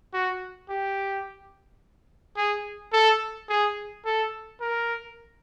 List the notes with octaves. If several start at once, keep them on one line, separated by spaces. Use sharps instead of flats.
F#4
G4
G#4
A4
G#4
A4
A#4